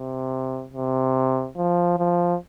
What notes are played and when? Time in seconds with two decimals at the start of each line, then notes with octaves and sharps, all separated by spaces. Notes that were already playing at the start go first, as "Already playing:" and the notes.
Already playing: C3
0.74 C3
1.57 F3
1.98 F3